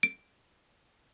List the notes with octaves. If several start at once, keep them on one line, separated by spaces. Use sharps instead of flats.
D7